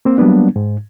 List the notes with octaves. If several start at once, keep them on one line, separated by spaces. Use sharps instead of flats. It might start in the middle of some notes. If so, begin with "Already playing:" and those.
A#3 C4
F#3 G3 A#3 B3 D4
G#2